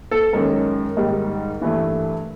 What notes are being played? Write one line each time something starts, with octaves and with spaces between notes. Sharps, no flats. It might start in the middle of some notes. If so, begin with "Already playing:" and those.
A4
F#2 D#3 G#3 A#4
G#2 D#3 G3
G2 E3 A3